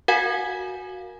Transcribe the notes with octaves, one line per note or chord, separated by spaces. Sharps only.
F#4 A#4 F5 F#5 G#5 G#6